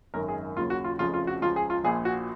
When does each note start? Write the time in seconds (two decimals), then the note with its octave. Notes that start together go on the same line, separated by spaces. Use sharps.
0.14 G#1 F#2 D#3 A#4
0.28 G#4
0.56 D#2 C#3 F#3 F4
0.70 F#4
0.84 F4
0.99 F1 F2 C#3 F3 F4
1.14 F4
1.27 F#4
1.42 C#2 C#3 F3 F4
1.56 G#4
1.70 F4
1.84 A#1 A#2 F3 G#4
2.05 F#4